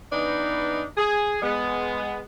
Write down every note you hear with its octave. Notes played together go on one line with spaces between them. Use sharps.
E3 B3 D4 D#4
G#4
G#3 B3